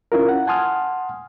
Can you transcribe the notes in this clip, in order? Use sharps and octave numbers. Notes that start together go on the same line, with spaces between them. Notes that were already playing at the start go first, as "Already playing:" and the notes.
C#4 E4 F4 A#4
F#5
F#5 G#5 A5 C6 D#6 F6